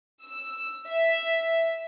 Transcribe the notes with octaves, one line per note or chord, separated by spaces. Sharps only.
E6
E5